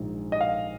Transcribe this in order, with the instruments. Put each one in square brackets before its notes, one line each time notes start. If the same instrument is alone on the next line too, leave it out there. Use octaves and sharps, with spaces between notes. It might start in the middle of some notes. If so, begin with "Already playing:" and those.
Already playing: [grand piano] A#1 G#2 D#3
D#5
F5